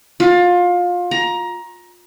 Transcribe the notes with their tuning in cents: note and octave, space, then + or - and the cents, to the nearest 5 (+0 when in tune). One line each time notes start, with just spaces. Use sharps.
F4 +25
A#5 +20